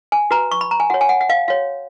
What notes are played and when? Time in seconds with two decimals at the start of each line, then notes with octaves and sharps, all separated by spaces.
0.12 G#5
0.31 F#4 B4 A#5
0.51 C#6
0.61 B5
0.71 A#5
0.80 G#5
0.90 F#4 C#5 F#5
1.01 G#5
1.09 F#5
1.21 F#5
1.30 F5
1.48 F#4 C#5 F5